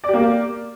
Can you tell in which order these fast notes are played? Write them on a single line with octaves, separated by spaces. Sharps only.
D5 G4 A#3 A#4